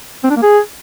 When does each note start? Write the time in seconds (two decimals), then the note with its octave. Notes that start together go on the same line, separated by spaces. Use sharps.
0.24 C4
0.30 D4
0.36 A#3
0.42 G#4